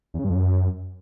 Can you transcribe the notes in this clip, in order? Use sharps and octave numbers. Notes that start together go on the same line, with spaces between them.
E2
C#3
G2
F2
F#2